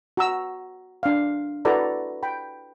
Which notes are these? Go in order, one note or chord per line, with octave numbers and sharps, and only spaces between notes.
F#4 A#5 E6
D4 F5
E4 F#4 A4 B4 D5 A#5
G5 B5